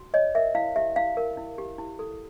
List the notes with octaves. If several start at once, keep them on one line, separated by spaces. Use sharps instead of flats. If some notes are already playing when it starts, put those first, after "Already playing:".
Already playing: F#4
C#5 D#5
A#4 E5
E4 F5
G4 E5
E4 F5
A#4
E4
G4
E4
A4